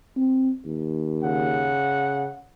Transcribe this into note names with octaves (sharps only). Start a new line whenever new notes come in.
C4
D#2
C#3 F#5